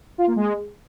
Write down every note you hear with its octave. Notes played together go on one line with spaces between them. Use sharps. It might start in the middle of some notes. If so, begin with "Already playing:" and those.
F4
A#3
G#3